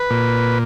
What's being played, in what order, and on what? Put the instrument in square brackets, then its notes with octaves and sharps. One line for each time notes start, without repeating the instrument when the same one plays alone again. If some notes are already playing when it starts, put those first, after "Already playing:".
Already playing: [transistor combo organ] B4
A#2